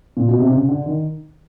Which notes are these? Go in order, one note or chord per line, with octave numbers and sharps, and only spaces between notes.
A#2
B2
C3
C#3
D3
D#3